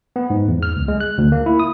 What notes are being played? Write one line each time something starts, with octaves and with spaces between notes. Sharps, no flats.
B3
G#2
E2
F6
C#2
G#3
F#6
D2
A#3
E4
D#6